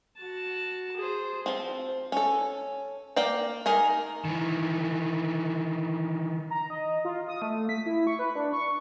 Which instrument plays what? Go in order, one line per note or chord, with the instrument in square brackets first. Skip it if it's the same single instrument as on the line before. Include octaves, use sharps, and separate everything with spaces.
[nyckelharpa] F#4 A5
G#4 C5
[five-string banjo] F3 C4
C#4 A4
A#3 D5 G5
D#3 G#4 A#4
[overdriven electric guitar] D#3 E3
[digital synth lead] A#5
D#5
F4
D#6
A3
B6
E4
C#6
B4
D4
C#6